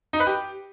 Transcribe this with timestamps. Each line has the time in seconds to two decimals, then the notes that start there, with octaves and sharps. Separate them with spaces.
0.13 D#4
0.20 B4
0.27 G4